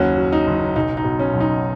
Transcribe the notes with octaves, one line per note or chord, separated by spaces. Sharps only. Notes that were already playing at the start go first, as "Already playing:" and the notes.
Already playing: F#1 D#2 C#4 F#4
F#3
D#4
F#1
B1 D#4
D#4
B2
C#4
B1
D#4